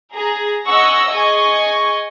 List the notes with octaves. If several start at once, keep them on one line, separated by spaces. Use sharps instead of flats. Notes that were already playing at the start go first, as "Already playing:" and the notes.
G#4 A#5
D#5 F#5 G#5 C#6 E6 A#6
G#4 D#5 G#5 C#6